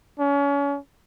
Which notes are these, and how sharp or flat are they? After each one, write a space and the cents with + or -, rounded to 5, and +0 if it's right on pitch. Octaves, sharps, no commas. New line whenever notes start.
C#4 +35